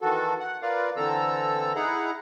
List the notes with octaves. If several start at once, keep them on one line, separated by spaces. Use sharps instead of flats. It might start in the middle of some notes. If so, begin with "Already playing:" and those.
D#3 E3 F#4 A4
F#5
F4 A#4 B4 D5 F5
D3 E3 C4 A4 A#5 E6
D#4 E4 G#4 F#5 A#5